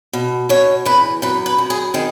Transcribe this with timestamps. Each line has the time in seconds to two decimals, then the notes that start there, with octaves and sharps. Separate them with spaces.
0.13 B2
0.49 B2 C#5
0.85 E2 B4
1.22 F#2 B4
1.46 B4
1.58 F#2
1.70 G#4
1.94 D#3 G#4